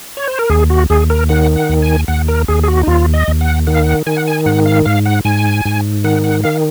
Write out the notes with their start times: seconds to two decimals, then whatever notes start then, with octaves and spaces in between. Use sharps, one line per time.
0.17 C#5
0.27 C5
0.39 A#4
0.50 D#2 G#4
0.70 F#4
0.90 D#2 G#4
1.10 A#4
1.29 D#3 F#5
1.56 F#5
1.69 D#2
1.82 G#5
2.08 D#2 F#5
2.28 A#4
2.48 D#2 G#4
2.63 G#4
2.68 F#4
2.83 D#4
2.87 D#2 F4
3.14 D#5
3.28 D#2
3.41 F#5
3.67 D#3 F#5
3.74 F5
3.82 F#5
4.06 D#3 G#5
4.17 F#5
4.27 G#5
4.46 G#2 F#5
4.66 F5
4.85 G#2 F5
5.06 F#5
5.25 G#2 G#5
5.65 G#2
6.04 D#3 F#5
6.24 F#5
6.44 D#3 F5